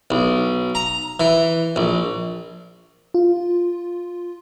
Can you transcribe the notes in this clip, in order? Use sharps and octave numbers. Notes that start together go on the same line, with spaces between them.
B1
A#5
E3
A#1
F4